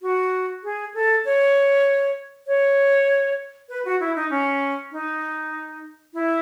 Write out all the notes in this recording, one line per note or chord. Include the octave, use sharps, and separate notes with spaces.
F#4
G#4
A4
C#5
C#5
B4
F#4
E4
D#4
C#4
D#4
E4